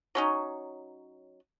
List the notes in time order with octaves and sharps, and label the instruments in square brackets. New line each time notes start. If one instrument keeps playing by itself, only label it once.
[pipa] F#3 C#4 D#4